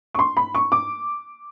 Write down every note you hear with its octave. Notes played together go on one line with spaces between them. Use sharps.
C#6
C6
B5
C#6
D6